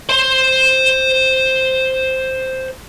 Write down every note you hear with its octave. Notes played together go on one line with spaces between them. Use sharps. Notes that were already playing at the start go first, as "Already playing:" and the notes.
C5 C6